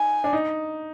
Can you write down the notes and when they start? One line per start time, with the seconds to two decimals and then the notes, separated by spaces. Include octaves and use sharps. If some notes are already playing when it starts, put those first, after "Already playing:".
Already playing: D#4 G#5
0.24 D4
0.33 D#4